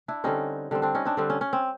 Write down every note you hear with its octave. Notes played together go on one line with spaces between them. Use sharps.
D4 E4
D3 G3 C4 C#4 D#4
D3 G3 C4
C4 D4
C#4 D#4
C4 D4
D3 G3 C4
C#4
C#4
C4